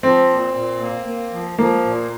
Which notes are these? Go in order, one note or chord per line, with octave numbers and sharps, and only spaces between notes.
F3 C4
A#2
A#2
A#3
A#3
F3
F3 A#3
A#2